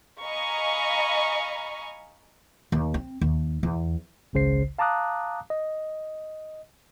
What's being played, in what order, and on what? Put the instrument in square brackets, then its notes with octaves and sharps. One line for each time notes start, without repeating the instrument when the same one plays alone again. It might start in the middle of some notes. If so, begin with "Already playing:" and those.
[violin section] D#5 F5 G#5 A#5 B5 C#6
[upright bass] D#2
C4
D#2
E2
[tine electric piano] G#1 C#2 C#3 C5 C7
F5 A5 A#5 D6 D#6 F#6
D#5